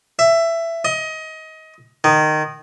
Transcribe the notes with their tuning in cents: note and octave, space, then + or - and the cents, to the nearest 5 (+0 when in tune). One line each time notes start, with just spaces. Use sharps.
E5 +15
D#5 +25
D#3 -15